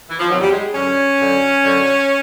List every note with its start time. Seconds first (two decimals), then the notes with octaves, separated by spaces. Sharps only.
0.09 E3
0.19 F3
0.29 E2 C3 D#3 F#3
0.40 G3
0.51 G#3
0.73 F#2 D3 C#4
1.18 F#2 D3
1.62 F#2 D3